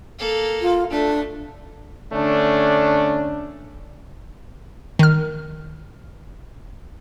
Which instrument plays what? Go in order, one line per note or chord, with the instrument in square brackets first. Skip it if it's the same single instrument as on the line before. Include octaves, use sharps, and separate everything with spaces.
[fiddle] A#3 A4
[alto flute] F4
[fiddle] A3 [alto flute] D4
[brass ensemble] D3 A3 C#4 D4
[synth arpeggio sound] D#3 F6